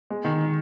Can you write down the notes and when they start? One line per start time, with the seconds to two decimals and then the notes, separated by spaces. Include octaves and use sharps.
0.10 G#3
0.25 D#3